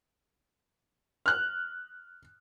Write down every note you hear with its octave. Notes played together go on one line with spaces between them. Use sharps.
F6 F#6